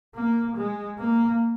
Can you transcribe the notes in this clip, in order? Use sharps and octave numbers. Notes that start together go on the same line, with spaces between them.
A#3
G#3
A#3